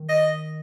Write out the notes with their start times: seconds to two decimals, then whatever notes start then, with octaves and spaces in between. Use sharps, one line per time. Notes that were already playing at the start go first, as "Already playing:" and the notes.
Already playing: D#3
0.09 D#5